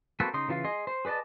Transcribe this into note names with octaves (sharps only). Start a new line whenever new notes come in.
A#3 C4 F#4 A4 B4
C#3 D#4 C6 D#6
C#3 E3 F4 F5
G#4 D#5 C6
C5
G#4 B4 D5 D#5 A5